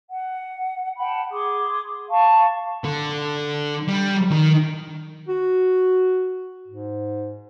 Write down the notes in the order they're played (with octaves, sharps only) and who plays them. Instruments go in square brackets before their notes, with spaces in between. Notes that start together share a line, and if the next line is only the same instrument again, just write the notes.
[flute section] F#5
F#5 G5 A5 B5
G#4 C6 D6 D#6
F5 A5 C#6
[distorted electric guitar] D3
G3
D#3
[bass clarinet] F#4
G#2